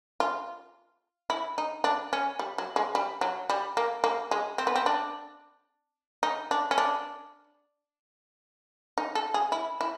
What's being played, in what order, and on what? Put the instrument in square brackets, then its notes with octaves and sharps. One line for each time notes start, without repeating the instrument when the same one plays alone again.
[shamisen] F4
E4
D#4
D4
C#4
G3
F#3
G#3
G3
F#3
G3
A#3
A#3
G#3
C4
B3
C4
D4
D#4
D4
C#4
D4
D#4
A4
G#4
E4
E4